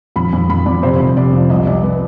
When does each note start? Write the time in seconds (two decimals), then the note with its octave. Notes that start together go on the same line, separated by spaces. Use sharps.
0.16 F2 B5
0.33 F2
0.49 F2 B5
0.66 F2 D5
0.83 C3 C5
1.00 F2
1.16 C3 D5
1.33 F3
1.50 C2 D#5
1.67 C2 D5
1.83 B4